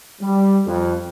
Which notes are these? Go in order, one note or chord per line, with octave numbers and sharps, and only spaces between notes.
G3
F2